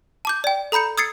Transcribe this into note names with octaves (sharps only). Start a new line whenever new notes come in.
A5 D6 G6
D5 G5
A4 A#5 B5 G6 C#7
D#6 E6 G#6 A6 C7 C#7